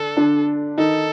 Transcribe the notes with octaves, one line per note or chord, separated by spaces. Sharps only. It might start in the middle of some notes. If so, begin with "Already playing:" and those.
Already playing: D3 D4 A4
D3 D4
D#3 D#4 A4